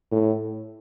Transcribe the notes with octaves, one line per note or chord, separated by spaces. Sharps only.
A2